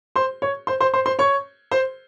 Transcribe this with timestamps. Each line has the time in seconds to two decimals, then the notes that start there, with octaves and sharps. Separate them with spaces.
0.16 C5 C6
0.42 C#5 C#6
0.67 C5 C6
0.80 C5 C6
0.94 C5 C6
1.06 C5 C6
1.19 C#5 C#6
1.72 C5 C6